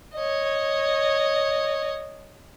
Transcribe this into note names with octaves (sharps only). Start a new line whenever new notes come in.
C#5 D#5